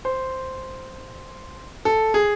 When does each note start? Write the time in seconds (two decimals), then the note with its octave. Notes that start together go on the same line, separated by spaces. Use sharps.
0.05 C5
1.85 A4
2.14 G#4